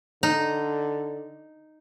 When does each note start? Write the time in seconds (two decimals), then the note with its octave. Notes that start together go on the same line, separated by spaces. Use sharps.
0.23 D3 D#4